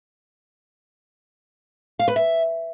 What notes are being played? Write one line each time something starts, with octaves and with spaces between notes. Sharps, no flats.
F5
B4
E5